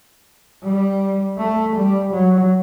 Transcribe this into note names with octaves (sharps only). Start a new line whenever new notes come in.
G3
A3
G3
F#3